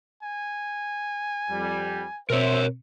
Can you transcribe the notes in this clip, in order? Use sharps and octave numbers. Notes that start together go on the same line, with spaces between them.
G#5
F2 G3
B2 C4 A#4 C5 C#5 E5